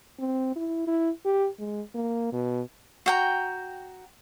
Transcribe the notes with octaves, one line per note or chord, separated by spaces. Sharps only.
C4
E4
E4
G4
G#3
A#3
B2
F#4 G5 A#5